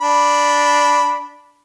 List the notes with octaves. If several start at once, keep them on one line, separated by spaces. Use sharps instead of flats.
D4 B5